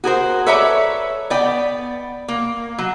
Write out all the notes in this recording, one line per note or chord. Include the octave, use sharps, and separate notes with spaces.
F#4 G#4 A#4 C5
A4 B4 C#5 D5 E5 A#5
B3 D5 G5
A#3
F#3